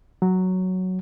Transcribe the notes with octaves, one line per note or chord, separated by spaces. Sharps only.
F#3